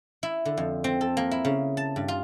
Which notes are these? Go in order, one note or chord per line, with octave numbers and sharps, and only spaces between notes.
E4
D3
F2
C4
A4
A#3
E4
C#3
A5
G2
F4